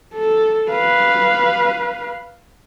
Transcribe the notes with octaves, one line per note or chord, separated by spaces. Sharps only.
A4
B4 F5